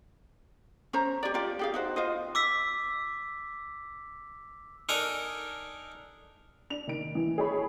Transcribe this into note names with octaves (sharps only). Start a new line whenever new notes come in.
C#4 C5 A#5
G4 D5
F4 G4 D5
G4 G#4 F5
D#4 F#4 C5
F4 C5 D#5
D6 E6 B6
D4 D#4 A4 A#4 G#5 A#5
D4 F7
D#3 D7
E3
G#4 A4 C#5 B5